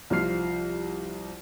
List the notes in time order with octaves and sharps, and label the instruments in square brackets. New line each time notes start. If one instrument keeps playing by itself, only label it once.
[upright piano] C2 F3 F4 F6 C7